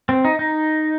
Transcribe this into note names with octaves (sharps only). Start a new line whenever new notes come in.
C4
D#4
D#4